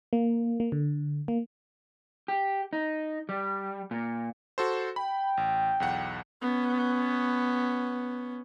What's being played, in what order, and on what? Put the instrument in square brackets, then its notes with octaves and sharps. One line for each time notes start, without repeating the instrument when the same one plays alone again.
[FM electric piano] A#3
A#3
D3
A#3
[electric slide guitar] G4
D#4
G3
A#2
[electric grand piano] F#4 A4 C5
[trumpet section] G5 [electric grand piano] B5
[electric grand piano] A1
B1 E2 F#5
[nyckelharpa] B3 C#4